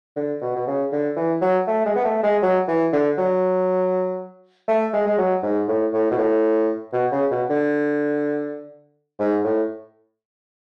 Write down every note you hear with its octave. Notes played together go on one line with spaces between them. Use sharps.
D3
B2
B2
C#3
D3
E3
F#3
A3
G#3
B3
A3
G#3
F#3
E3
D3
F#3
A3
G#3
G#3
F#3
G#2
A2
A2
B2
A2
B2
C#3
B2
D3
G#2
A2